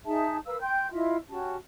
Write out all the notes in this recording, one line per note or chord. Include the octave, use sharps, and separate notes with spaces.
D#4 G#4 E5 A5
A#4 B4 F5 E6
G5 C6 G6
E4 F4 D#5 E5
C#4 F#4 G4 A5